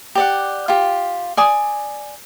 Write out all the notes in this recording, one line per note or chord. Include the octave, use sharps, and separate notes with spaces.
G4 D5 F#5
F4 G4
D5 G#5 D#6